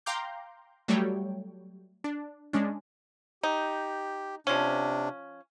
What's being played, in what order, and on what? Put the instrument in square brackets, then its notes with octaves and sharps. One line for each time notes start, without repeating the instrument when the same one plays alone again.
[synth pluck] F5 G5 A#5 C6 D6 G6
F#3 G3 A3 C#5 G5
D4
G#3 C#4 D4
[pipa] D#4 [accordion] G4
[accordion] C3 D4 [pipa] F3 C#4